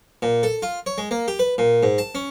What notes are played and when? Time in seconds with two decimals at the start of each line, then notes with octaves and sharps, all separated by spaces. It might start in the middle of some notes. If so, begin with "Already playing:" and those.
0.22 A#2
0.43 A4
0.62 F4
0.86 C#5
0.98 G#3
1.11 A#3
1.28 G4
1.39 B4
1.58 A#2
1.83 G#2
1.98 A5
2.15 C#4